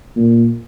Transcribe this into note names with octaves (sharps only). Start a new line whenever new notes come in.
A#2